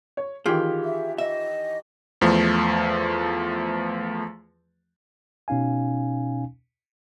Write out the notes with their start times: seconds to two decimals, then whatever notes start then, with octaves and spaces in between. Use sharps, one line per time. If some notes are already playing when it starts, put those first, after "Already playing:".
0.17 C#5
0.46 D#3 E3 F4 G4 G#4 G5
0.84 E5
1.18 D#5 E5
2.21 E2 F3 A3
5.48 B2 C#4 D#4 F5 G#5